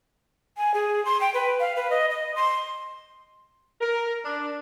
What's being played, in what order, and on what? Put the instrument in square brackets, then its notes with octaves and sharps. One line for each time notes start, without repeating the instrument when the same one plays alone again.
[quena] G#5
G#4
C6
G5
B4
F5
B4
D#5
D#5
C6
[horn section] A#4
D4